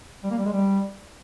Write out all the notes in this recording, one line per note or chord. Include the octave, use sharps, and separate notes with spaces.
G3
A#3
G3
G#3
G3